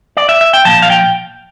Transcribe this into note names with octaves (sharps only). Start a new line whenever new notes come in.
D5
E5
E5
G5
A#2 F3 A5
F5
G5